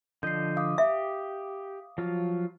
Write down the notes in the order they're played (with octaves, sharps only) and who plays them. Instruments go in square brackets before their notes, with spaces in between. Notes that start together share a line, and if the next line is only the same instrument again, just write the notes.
[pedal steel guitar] D3 F3 D#5 [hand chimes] G6 C7
[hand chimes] F5 D6 D#6
[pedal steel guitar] G4 [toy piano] E5
[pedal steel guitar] F3 F#3 F4